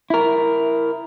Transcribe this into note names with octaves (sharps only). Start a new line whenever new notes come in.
E4 A#4